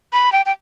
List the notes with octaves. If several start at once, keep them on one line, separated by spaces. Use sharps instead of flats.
B5
G5
G5